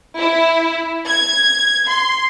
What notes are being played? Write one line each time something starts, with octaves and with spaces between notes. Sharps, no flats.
E4
G#6
C6